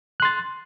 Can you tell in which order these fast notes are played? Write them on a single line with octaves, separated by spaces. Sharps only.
F#6 C6 A6